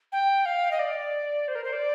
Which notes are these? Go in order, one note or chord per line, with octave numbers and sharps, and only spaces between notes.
G5
F5
D#5
D5
C5
A#4
C5
D5